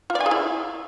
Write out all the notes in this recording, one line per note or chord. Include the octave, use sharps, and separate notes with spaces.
F4
D5
G#5
G#4
E4